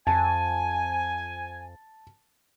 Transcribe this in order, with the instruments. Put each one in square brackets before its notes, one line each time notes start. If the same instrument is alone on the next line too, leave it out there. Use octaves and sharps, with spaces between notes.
[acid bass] F2 [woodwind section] G#5 [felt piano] A5